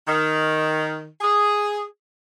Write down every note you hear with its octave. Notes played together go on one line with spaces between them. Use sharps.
D#3
G#4